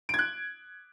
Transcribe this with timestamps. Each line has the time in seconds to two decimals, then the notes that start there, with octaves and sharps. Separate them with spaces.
0.09 D7
0.14 G#6
0.19 F#6